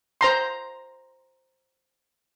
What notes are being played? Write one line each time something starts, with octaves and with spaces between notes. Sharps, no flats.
C5 A#5 C6